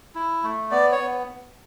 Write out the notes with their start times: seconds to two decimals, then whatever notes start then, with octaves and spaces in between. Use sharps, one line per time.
0.15 E4
0.43 A3
0.71 B3 D5
0.92 C#5
0.99 B3